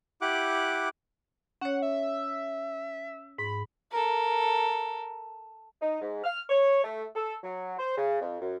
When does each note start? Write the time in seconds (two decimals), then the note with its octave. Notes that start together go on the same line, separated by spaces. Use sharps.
0.22 E4 G4 F#5 D6 F#6
1.62 C#4 C#5 F#5
1.82 E5
3.38 G#2 B5
3.92 A4 A#4
5.81 D#4
6.01 G#2
6.24 F6
6.49 C#5
6.84 A3
7.15 A4
7.43 F#3
7.79 C5
7.97 C#3
8.21 F2
8.41 F#2